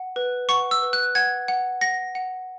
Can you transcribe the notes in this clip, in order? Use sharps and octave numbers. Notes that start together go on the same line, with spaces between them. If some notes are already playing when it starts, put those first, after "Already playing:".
Already playing: F#5
B4
F#5 C#6
E6
B4
F#6
F#5 G#6
F#5
F#5 A#6
F#5